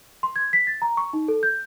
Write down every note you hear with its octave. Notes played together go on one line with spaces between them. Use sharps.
C6
G#6
B6
A6
A#5
C#6
D#4
A4
G6